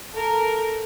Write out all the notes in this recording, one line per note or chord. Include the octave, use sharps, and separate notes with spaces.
A4 A#4